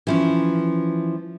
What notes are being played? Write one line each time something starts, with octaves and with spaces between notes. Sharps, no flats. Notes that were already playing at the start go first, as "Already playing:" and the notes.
E3 F3 C#4